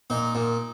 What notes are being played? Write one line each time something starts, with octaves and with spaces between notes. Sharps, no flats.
A#2 D#4
A#2